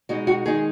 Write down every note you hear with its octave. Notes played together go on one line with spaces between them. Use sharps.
B2 G#3 D#4 F#4
F#4
D#3 G#3 D#4 G#4